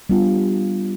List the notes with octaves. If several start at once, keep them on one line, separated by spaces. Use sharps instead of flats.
G3 B3 D4 F4